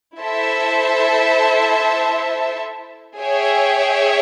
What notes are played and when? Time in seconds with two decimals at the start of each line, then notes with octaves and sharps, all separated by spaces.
0.19 E4 A4 C5 E5 A5
3.18 G#4 C#5 E5 G5